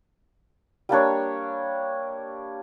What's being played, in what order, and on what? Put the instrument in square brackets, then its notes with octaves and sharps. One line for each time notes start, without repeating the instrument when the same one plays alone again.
[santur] G3 A#3 D4 C#5